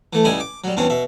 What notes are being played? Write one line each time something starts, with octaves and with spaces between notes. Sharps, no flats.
E3 A3
C#2 G3 E4 D#5 G#5
D6
F#3 G3
E2 G2 C4 C#4
B2 E5